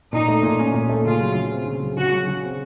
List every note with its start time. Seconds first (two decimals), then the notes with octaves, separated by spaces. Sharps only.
0.13 A#2 D#4
0.28 A3
0.43 A#2
0.59 C#4
0.74 A#2
0.90 A3
1.05 C#3 F4
1.20 F#3
1.35 C#3
1.52 C4
1.66 C#3
1.82 F#3
1.97 C#3 F#4
2.12 F#3
2.28 C#3
2.44 C4